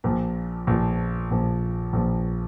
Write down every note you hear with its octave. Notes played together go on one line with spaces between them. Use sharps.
A#1 A#2 F3
A#1 A#2 F3
A#1 A#2 F3
A#1 A#2 F3